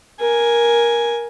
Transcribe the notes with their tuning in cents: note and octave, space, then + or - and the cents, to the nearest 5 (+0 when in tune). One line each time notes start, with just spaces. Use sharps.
A#4 +15 G#5 +0